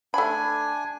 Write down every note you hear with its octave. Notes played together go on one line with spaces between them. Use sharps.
A3 D4 G#5 B5